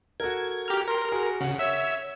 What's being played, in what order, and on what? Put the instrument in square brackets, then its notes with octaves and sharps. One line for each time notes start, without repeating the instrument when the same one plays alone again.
[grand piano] F#4 A4 A#4 [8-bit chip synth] G#6
[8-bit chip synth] G4 F6 [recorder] A#5
[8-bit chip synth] A#4 [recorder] C6
[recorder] F#4 [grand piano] G#4
[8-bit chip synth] C#3 [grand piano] F#5
[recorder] C#5 [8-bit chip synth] E5 E6